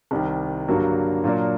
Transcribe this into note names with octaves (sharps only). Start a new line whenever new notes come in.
C2 C3 D#3
G2 D3 F#3 A#3 F#4
A#2 F#3 A#3 D4